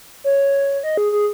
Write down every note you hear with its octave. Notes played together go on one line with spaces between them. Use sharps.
C#5
D#5
G#4
G#4